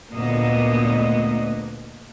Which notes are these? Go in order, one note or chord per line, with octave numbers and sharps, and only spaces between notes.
D2 A#2 A#3 B3 D#5